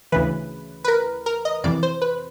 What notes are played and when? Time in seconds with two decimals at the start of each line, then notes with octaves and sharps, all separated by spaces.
0.12 D2 C#3 E3 B4
0.84 B4
0.88 A#4
1.26 A#4
1.45 D#5
1.64 F2 C3 E3 D5
1.83 C5
2.02 B4